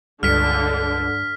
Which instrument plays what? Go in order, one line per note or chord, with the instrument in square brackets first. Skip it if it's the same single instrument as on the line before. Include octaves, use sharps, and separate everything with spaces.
[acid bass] C#2 [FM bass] G2 [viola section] D3 [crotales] F6 B6